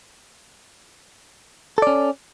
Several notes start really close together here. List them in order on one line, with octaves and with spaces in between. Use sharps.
A4 D5 C#4